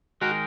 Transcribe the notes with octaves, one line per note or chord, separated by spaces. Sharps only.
D#3 G#3 D#4 F#4 A#4